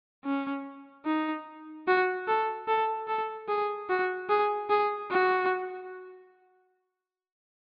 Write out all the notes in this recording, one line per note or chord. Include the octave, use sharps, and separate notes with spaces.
C#4
D#4
F#4
A4
A4
A4
G#4
F#4
G#4
G#4
F#4